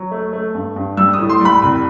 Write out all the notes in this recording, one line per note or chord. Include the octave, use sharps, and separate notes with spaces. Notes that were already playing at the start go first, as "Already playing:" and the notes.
Already playing: F#3
A3
A3
G2
G2
G3 E6
D#6
A2
C6
G3 B5
C2